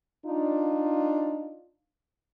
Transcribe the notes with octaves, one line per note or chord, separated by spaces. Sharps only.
D4 D#4 F4